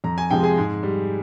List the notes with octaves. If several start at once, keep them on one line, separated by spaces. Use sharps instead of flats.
F2 A#5
G#5
C3 F3 G#3 G5
G#4 G#5
G#2
G3